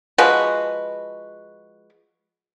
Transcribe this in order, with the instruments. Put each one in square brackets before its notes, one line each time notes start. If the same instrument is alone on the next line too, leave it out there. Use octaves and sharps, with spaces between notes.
[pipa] F3 G#3 F#4 B4